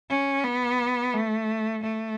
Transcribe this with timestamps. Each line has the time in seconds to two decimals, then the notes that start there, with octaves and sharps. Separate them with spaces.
0.10 C#4
0.44 B3
1.14 A3
1.83 A3